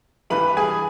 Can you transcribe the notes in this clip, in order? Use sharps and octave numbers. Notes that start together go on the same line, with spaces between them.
G2 E3 G3 B4 B5
G#4 G#5